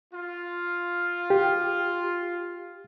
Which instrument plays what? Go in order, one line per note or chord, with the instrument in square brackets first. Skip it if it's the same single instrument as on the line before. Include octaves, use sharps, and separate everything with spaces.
[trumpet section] F4
[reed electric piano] G4